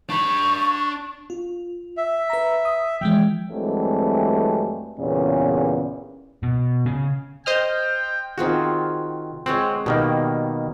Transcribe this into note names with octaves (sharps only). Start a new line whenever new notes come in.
D4 B5 C#6
F4
E5
B4 A#5
D#6
E3 F3 G#3 G5
G2 E3 F#3 G#3 A3 C4
E2 G2 A#2 C#3 C#4
B2
C#3
C5 D#5 G5 F6
D#3 C4 F4 F#4 G#4
G#3 C4 C#5 F#5
B2 D#3 G3 A#3